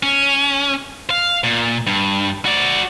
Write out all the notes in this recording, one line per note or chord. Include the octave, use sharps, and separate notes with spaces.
C#4
F5
A#2
G2
F#4 D5